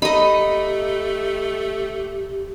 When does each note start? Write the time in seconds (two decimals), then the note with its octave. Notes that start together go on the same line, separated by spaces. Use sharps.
0.02 A3 D#4 G4 D#5 B5